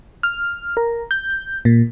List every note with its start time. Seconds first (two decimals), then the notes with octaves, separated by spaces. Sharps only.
0.23 F6
0.77 A#4
1.11 G6
1.65 A#2